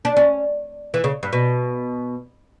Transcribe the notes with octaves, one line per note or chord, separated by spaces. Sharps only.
D4
C#4
E3
C#3
G2
B2